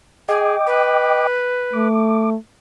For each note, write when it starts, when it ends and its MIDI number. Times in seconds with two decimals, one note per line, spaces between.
0.28 0.56 68
0.28 1.27 75
0.28 1.27 79
0.28 1.27 86
0.67 1.88 71
1.73 2.37 57
1.73 2.30 86